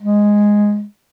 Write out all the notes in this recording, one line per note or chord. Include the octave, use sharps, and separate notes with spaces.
G#3